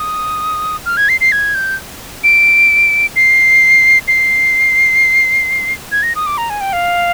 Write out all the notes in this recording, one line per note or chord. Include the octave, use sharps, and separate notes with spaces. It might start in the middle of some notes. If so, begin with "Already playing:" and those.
Already playing: D#6
F6
G#6
C7
C7
G#6
G6
D7
C7
C7
G#6
A#6
D#6
D6
A#5
G#5
G5
F5